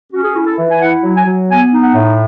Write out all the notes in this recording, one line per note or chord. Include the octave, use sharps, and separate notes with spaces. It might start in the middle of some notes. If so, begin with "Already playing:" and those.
C#4 F#4
G#4
F#4
E4
A4
E3
G#5
E4 F#5
F#3
G#5
F#3
B3 G#5
D#4
F#5
A2